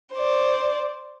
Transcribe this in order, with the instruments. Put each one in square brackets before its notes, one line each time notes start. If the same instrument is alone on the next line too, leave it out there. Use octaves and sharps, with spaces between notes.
[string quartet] C5 D5